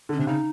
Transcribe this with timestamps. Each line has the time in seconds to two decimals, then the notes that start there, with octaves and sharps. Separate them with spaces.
0.09 D3
0.13 C#4
0.18 C3 D4
0.27 C#3 D#4